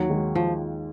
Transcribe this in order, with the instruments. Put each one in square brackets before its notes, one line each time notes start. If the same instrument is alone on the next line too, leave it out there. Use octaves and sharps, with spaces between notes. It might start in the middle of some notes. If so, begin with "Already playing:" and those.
Already playing: [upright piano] D#2 [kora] F#3
[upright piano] D#3 G#3
[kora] F3